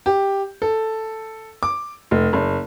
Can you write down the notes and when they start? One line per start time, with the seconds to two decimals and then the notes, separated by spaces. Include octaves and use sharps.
0.06 G4
0.62 A4
1.63 D6
2.11 F1
2.33 F#1